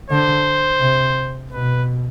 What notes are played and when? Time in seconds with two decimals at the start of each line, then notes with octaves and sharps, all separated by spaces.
0.10 D3 C5
0.81 C3
1.51 B2 B4